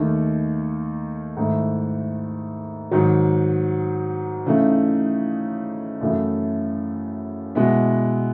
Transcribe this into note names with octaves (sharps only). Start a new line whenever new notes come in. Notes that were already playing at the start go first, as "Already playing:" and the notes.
Already playing: D#2 D#3 A3 D#4
G#2 D#3 A3 E4
G#2 D#3 F#3
C#3 E3 A3 D#4
F#2 C#3 E3 A3 E4
B2 G#3 B3 E4